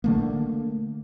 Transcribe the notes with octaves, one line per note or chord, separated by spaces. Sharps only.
D3 A3 A#3